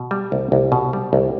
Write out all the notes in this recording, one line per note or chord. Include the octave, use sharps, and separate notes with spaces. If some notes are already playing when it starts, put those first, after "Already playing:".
Already playing: B2
G3
C2
C2
B2
G3
C2